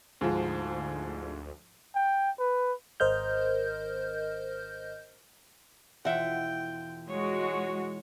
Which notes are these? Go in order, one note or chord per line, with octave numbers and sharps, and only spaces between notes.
D2 G#2 F3
G5
B4
G#1 A#4 C5 D#5 F6 G6
E1 F4 E5 F#5 G5
G#3 F#4 C#5